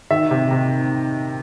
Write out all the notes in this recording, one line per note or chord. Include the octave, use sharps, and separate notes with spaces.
D#3 E5
C3
C3